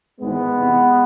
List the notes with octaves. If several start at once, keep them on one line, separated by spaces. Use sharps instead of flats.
G#1 G#2 E3 G#3 B3
E2 C3 E3